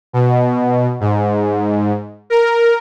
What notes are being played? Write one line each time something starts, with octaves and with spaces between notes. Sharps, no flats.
B2
G#2
A#4